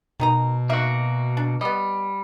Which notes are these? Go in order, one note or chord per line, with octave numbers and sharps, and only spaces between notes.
B2 D#3 D#4 A#5
A#3 D#4 F#4 E5
D4
G3 B3 D#5